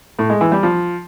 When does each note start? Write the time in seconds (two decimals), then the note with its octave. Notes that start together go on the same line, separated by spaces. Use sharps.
0.19 A2
0.30 G#3
0.41 E3
0.52 G3
0.63 F3